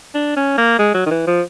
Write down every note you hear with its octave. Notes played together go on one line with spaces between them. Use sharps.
D4
C#4
A#3
G#3
F#3
D#3
E3
F3